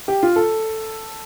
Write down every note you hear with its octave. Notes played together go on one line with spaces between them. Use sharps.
G4
F4
A4